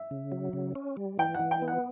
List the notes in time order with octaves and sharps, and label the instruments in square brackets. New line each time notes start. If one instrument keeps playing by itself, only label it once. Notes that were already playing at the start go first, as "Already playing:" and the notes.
Already playing: [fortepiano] E5
[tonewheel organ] C#3
F#3
C#3
C#4
G3
[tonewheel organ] E3 [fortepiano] G5
[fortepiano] F#5
[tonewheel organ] E3
[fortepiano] G5
[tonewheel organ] B3
[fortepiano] F#5